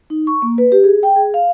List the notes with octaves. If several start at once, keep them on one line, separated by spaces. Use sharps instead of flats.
D#4
C#6
A#3
B4
G4
G#4
G5
G#4
F5